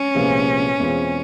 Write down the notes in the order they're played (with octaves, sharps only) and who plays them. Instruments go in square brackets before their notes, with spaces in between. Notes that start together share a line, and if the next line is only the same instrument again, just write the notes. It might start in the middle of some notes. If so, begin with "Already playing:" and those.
Already playing: [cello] C#4
[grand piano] C2 A#2 F3 G#3 B3
E2 B2 G#3 C4 F4